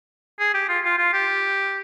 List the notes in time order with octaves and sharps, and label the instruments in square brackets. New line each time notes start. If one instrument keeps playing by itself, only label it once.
[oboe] G#4
G4
F4
F4
F4
G4